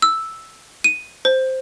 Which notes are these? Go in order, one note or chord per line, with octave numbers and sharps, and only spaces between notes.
E6
D#7
C5